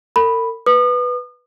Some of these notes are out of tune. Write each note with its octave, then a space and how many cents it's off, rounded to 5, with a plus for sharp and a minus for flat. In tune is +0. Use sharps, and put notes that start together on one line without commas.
A#4 -45 B5 +0
B4 +0 D#6 -40